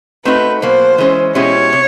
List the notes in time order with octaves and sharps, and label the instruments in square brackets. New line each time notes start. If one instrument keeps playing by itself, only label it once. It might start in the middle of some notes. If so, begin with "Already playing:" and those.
[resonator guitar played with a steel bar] A3 C4 D#4 F#4 [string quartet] B4
[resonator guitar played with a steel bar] B2 F#3 A#3 [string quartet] C5
[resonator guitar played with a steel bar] E3 G#3 C#4
[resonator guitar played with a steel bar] B2 G#3 C#4 E4 G4 [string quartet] C#5
[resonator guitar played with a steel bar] C3